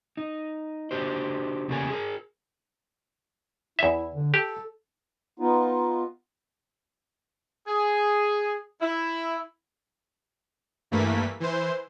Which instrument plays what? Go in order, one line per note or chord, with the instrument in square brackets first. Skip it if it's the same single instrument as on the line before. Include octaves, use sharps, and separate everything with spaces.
[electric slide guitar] D#4
D4 F#4 G4 C5
E2 C#3 G3 A#3 A4 G#5
G#4 A#4
[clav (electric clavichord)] E2 E5 [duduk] E4
[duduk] D3
[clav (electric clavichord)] G4 [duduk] A4
[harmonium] B3 D#4 F4
[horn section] G#4
E4
[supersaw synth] G2 E3 A3 A#3 B6
E3 C5